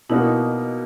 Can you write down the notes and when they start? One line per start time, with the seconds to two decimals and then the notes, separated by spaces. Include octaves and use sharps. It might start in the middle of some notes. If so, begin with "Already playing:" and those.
0.09 B2 A#3 D#4 E4 F#4